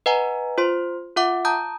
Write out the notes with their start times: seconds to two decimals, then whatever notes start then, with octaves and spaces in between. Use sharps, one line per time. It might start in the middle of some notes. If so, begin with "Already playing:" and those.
0.06 B4 D#5 F#5 G#5 A#5
0.58 F4 C5 C6
1.16 F4 E5 F#5 D6
1.45 A5 A#5 D#6 G6